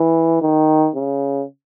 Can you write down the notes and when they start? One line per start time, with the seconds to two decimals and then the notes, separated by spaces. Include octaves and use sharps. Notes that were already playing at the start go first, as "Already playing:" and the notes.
Already playing: E3
0.41 D#3
0.96 C#3